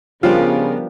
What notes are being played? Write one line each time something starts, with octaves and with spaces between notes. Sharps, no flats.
C#3 F3 G3 B3 D4 F4 A#4